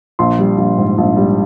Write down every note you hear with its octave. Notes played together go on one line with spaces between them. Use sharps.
A#1 C6
G3
A#1
G#2
A#1
G3